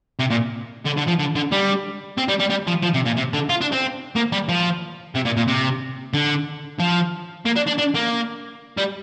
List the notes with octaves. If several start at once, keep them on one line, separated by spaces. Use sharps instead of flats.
C3
A#2
D3
D3
F3
D3
D3
G3
C4
G3
G3
G3
F3
F3
C3
A#2
C3
D3
F4
D4
C4
A#3
G3
F3
C3
A#2
A#2
C3
D3
F3
A#3
D4
D4
D4
A#3
G3